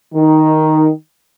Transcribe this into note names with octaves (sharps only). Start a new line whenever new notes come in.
D#3